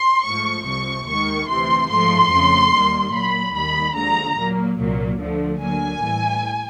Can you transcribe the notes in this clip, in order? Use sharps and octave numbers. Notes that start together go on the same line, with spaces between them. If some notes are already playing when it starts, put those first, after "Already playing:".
Already playing: C6
G#2 F3 A3 C#6
C2 C3 F3 C#6
D#2 D#3 G#3 C#6
D2 C3 E3 C6
G#2 F3 A3 C6
F2 C#3 F3 A3
D#2 D#3 G3 A#3
A#2 F#3 A#3 B5
D#2 D#3 G3 B5
D#2 D3 F3 G#3 A#5
A#2 F#3 A#3
C2 A#2 F#3 A#3
D2 D3 F3 A3
D2 D3 F#3 A#3 G#5
A2 E3 G3